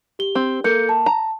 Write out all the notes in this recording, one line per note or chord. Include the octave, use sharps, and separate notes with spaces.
G4 G7
C4
A#3 A4 G6 C#7
A5
A#5